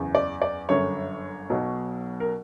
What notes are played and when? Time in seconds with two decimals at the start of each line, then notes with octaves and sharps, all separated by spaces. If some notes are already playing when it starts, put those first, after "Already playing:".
Already playing: F#1 E2 C#3
0.15 D5
0.42 D5
0.69 G1 F#2 D3 C#5
1.50 B1 B2 F#3
2.20 A#4